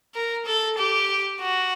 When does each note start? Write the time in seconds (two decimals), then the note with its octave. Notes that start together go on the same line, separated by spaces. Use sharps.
0.15 A#4
0.46 A4
0.78 G4
1.41 F#4